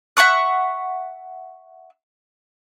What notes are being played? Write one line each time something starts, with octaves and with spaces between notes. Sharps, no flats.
E5 F#5 C#6 F#6